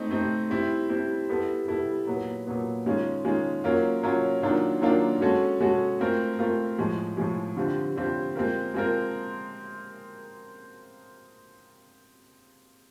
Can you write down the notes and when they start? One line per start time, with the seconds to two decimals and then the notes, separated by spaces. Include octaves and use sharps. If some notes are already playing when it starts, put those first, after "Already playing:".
Already playing: A3 C4 D#4
0.11 A3 C4 D#4
0.50 G3 C4 E4
0.89 G3 C4 E4
1.29 G3 B3 E4 A4
1.68 G3 B3 E4 A4
2.07 A#2 F#3 B3
2.47 A#2 F#3 B3
2.86 D#3 G#3 C#4 F4
3.25 D#3 G#3 C#4 F4
3.64 F#3 A#3 C#4 F4 A#4
4.03 F#3 A#3 C#4 F4 A#4
4.42 D#3 F#3 A#3 D4 F4
4.81 D#3 F#3 A#3 D4 F4
5.21 G#3 C#4 F#4 A4
5.60 G#3 C#4 F#4 A4
5.99 A3 C4 F4 A#4
6.39 A3 C4 F4 A#4
6.79 A2 F3 G#3
7.17 A2 F3 G#3
7.57 D3 G3 C4 F4
7.96 D3 G3 C4 F4
8.36 G#3 C4 F4 A#4
8.74 G#3 C4 F4 A#4